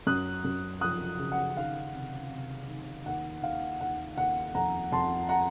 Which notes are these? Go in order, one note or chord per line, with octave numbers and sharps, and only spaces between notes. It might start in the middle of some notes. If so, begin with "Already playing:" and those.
F#2 D#6 F#6
F#2
F3 D#6 F#6
C#3
F#5
D#3 F5
C3
C3
D#3
D#2 F#5
D#2 F5
D#2 F#5
D#2 F#5
F2 F#5 A#5
F2 A5 C6
F#5 A#5